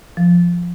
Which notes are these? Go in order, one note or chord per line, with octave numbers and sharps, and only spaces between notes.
F3